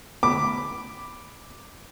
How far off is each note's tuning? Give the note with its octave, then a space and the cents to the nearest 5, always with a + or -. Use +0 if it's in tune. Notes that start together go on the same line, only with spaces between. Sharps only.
B5 +0 D6 +0